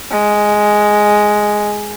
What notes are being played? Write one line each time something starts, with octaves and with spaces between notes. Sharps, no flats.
G#3